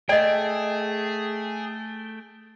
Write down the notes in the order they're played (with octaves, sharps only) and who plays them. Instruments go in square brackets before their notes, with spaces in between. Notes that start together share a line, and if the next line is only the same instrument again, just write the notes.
[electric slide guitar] A3 G5 [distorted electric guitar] G#4 [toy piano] D5 D#5